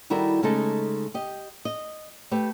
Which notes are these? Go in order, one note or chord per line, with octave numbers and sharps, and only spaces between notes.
D#3 G3 E4 F#4 A4 A#4
C#3 G#3 A3 D#4 A4 A5
G4 D#5
D#5
A3 G4 B4